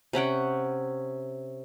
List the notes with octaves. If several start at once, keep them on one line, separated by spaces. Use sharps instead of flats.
C3 C#4 F#5 G5